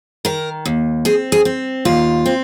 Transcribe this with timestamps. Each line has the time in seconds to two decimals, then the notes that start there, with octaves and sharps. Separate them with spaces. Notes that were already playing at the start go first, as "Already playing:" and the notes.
0.25 D#3 A#4
0.66 D#2
1.05 C4 G#4
1.32 G#4
1.45 C4
1.85 D#2 F4
2.26 C4